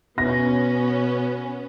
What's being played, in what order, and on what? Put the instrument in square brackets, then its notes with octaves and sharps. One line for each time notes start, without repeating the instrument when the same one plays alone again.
[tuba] B2 [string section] B3 C#4 [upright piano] A#6